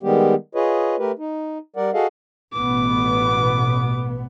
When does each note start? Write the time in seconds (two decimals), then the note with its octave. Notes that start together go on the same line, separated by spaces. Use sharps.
0.03 D#3 G3 G#3 B3 G4
0.55 F4 G#4 B4 C#5 D#5
0.99 A3 G4 A#4 B4
1.19 D#4
1.76 G3 A#4 D5 F#5
1.94 F#4 G#4 A4 D#5 F5 F#5
2.54 A1 B2 B3 D6